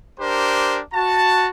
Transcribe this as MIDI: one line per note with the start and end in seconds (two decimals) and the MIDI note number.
0.20 0.81 62
0.20 0.81 67
0.20 0.81 70
0.20 0.81 72
0.94 1.48 66
0.94 1.48 81